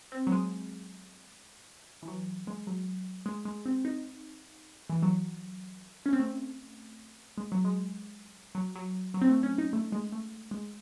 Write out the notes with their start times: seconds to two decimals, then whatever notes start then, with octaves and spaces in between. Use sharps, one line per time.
0.12 C4
0.27 F#3
0.32 G#3
2.02 E3
2.08 F#3
2.47 G#3
2.67 F#3
3.26 G#3
3.45 G#3
3.66 C4
3.85 D#4
4.90 E3
5.03 F#3
6.06 C#4
6.13 C4
6.19 A3
7.38 G#3
7.52 F#3
7.65 G#3
8.55 F#3
8.75 F#3
9.14 F#3
9.22 C4
9.29 A3
9.43 C#4
9.58 D#4
9.73 A3
9.92 G#3
10.12 A3
10.51 G#3